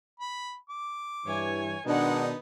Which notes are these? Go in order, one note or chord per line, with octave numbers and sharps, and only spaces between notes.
B5
D6
G2 E3 C#5 G#5
B2 D#3 G#3 B3 D4 D#4 F#5